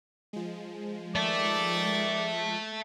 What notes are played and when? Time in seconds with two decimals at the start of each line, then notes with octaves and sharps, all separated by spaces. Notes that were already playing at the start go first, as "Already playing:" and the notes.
0.33 F3 G#3
1.16 D#3 D5 E5 A5